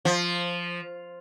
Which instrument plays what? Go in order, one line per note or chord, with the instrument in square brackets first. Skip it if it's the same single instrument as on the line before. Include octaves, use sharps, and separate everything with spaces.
[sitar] F3